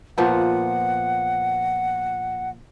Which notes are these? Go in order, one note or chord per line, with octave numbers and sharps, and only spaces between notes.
A#2 F3 B3 F#5